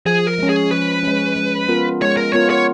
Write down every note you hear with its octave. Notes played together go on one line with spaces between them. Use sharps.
F3 G#4
A#4
G#3 C#4
G#4
F3 B4
G#3 C#4
G#3
B3 F4 A#4
G#3 C#5
A#4
B3 F4 A#4 C#5
C#5